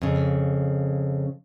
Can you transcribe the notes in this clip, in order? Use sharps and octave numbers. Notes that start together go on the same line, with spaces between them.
F2 C#3